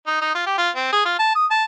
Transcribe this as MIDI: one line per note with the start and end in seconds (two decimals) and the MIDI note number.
0.07 0.21 63
0.21 0.34 63
0.35 0.46 65
0.46 0.53 67
0.58 0.70 65
0.76 0.90 60
0.92 1.02 68
1.05 1.18 65
1.19 1.33 81
1.35 1.46 87
1.51 1.64 81